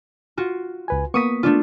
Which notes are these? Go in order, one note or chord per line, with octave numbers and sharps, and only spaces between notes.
F4 F#4
C#2 B4 G#5
A#3 B3 C#6 D#6 B6
A3 D4 F4